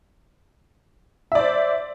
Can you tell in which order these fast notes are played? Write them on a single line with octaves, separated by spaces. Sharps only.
E5 D5 C5